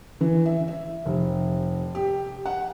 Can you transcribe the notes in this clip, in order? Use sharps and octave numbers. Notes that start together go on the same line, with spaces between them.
E3
E5
E5
F1
G4
F#5